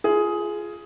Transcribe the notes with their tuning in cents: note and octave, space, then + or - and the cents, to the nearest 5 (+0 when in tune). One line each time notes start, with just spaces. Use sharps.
F4 -20 G#4 +10